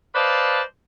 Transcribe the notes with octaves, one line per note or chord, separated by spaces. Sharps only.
B4 C5 D5 D#5 F5 A5